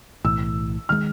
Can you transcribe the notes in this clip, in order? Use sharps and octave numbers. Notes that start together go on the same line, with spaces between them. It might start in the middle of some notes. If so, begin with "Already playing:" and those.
B1 A2 E3 E6
D#3 G#3 F6